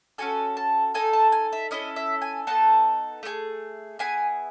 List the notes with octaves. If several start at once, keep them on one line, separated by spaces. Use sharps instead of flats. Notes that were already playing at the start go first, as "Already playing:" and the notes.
C#4 F#4 A4 G#5
A5
D#4 A4 G#5
A5
G#5
E5
C#4 E4 A4 D#5
E5
G#5
B3 D#4 A4 A5
A3 E4 G#4
B3 E4 G#4 G#5